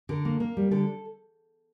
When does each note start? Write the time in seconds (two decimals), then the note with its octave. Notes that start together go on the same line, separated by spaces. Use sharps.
0.09 D3 A#4
0.25 A#3
0.40 A#3
0.57 G3
0.71 D3 A4